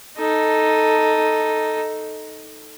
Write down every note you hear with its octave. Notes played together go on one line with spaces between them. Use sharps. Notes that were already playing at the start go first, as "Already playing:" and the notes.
D#4 A4